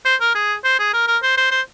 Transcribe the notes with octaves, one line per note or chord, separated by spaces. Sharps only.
C5
A#4
G#4
C5
G#4
A#4
A#4
C5
C5
C5